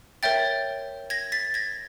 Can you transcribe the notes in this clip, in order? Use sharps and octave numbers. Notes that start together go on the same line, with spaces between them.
A#4 C#5 E5 G5 G6 A6
G#6 A#6
A6 B6
G#6 A#6